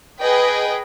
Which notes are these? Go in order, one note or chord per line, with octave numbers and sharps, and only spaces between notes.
G#4 B4 D#5 G5